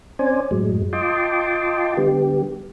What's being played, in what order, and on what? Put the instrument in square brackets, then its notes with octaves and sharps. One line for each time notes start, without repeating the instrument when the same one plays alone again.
[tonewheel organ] C4 C#4 C5 D5 G#5
F#2 A2 F#3 G#3
F4 D#5 G5 A5 C6 D6
D3 G3 B3 G4